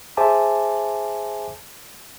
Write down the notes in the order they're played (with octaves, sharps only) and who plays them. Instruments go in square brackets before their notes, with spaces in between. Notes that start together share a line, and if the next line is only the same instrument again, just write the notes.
[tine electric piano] G#4 C5 E5 G#5 A5 D6